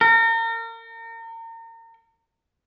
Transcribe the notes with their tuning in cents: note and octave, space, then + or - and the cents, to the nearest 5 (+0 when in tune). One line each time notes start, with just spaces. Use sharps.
A#4 -35